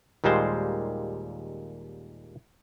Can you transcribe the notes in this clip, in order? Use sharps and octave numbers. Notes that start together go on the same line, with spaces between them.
D#2 A#2 G3 G#3 C5